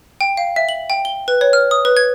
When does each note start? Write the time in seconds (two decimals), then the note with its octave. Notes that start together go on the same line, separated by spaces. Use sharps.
0.21 G5
0.37 F5
0.56 E5
0.69 F#7
0.90 G5
1.05 G7
1.28 B4
1.41 C#5
1.53 F6
1.71 D#6
1.85 B4
1.97 G#6